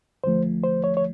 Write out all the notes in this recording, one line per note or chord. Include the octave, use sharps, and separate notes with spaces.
D#2 D3 F3 A3 C5
C5
C#5
C#5